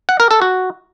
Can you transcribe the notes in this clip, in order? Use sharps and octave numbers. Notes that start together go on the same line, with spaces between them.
F#5
A#4
A4
F#4